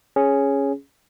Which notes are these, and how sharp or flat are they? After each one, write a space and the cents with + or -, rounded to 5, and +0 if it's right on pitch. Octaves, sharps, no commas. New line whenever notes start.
C#4 +0 G#4 +0